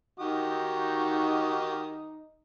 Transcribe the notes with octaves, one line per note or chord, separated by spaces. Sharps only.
D#3 D#4 F#4 G4 D#6